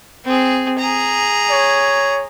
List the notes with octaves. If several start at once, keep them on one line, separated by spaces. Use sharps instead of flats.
C4 G#4
G#4 A#5
C#5